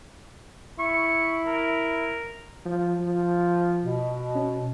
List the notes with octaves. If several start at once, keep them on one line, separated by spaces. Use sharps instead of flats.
E4 C#6
A#4
F3
F3
B2
C#4